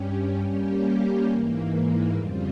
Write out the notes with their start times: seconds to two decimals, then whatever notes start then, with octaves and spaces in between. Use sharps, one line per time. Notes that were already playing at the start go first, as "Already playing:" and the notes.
Already playing: G2 G3 C#4
0.44 G3 A#3 C#4 G4
1.30 G#2 E3 A#3
2.15 F2 C#3 G3 C4 F4